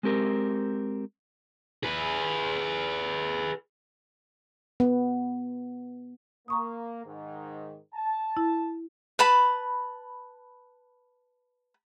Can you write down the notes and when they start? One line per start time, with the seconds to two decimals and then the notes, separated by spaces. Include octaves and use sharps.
0.03 G#3 C4 G4 A#4
1.83 G#4 B4
4.80 B3
6.48 A#3 A#5 C#6 D#6
7.05 G#2 D#3
7.94 A5
8.37 E4
9.19 B4 A5 B5